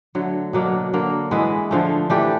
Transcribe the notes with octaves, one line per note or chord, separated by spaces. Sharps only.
D3 F#3 A3
B2 F#3 A#3 D4
D3 F#3 A#3
E3 G#3 B3 E4
D3 F3 A3
E3 A3 D4 G4